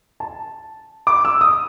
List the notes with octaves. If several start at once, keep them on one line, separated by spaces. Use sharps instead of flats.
A5
D6
E6
D#6